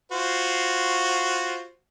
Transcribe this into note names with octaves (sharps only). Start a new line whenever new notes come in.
F4 F#4 C5